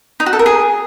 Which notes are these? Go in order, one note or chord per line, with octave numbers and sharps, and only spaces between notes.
D#4
F#4
A4
A#4
G#4